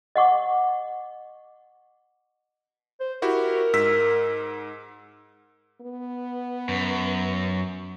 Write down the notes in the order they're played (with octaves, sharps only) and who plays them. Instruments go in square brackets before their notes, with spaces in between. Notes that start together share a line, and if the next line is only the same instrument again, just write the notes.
[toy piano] D#5 F#5 C#6 D6
[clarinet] C5
[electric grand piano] E4 F#4 G4 [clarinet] A#4
[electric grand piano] G#2 E6 B6
[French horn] B3
[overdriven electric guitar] F#2